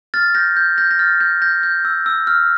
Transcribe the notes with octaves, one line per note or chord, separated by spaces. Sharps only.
F6 A6
G6 A#6
G6
G6 A#6
A#6
F6 A6
G6 A#6
G6 A#6
G6
E6
E6
F6